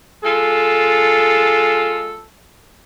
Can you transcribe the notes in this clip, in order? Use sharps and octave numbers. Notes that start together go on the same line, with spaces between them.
G#3 F4 A4